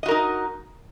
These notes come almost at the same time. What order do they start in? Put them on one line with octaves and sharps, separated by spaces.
D#5 F#4 A#4 D#4